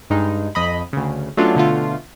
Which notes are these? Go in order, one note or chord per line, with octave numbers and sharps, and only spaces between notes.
G2 G#3 D#4
F2 D#5 B5
D2 C#3
F#3 A3 B3 C#4 D4 F4
B2 D3 A3 F4